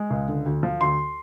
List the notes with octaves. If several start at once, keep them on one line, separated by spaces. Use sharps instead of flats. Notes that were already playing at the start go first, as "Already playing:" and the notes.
Already playing: G#3
C#2
D3
D2
F3
D2 C6